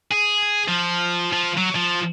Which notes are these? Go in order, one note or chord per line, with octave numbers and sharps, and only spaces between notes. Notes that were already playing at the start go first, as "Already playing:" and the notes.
G#4
F3
F3
F#3
F3